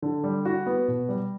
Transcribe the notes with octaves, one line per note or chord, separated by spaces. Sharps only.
D3
G3
F#4
B3
B2
G3